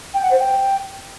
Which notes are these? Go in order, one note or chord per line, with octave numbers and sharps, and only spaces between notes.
G5
F#5
C5
G5